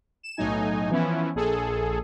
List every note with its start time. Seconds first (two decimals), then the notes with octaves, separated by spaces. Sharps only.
0.23 E7
0.37 B1 A2 F#3 D#4 G#5
0.90 E3 F3 B3 C#4 E4
1.35 A#1 G#4 A4